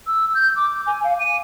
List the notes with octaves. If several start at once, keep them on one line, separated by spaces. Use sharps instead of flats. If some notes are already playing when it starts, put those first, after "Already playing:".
E6
G6
D6
G#5
F5
D#7